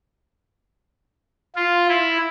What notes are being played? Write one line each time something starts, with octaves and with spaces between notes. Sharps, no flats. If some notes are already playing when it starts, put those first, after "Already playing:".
F4
E4